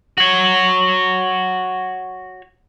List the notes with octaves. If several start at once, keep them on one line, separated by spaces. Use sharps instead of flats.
F#4 C#5